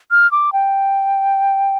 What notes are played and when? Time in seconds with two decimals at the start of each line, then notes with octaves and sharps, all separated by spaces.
0.11 F6
0.32 D6
0.53 G5